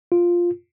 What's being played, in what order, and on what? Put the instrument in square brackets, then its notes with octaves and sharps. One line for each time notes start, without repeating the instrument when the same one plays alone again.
[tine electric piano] F4